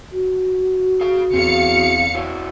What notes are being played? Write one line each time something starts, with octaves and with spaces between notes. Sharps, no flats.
F#4
G#4 F5
E2 C4 G#4 F5 C#7
E4 F#4 C#5